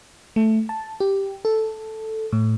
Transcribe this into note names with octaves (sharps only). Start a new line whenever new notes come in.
A3
A5
G4
A4
A2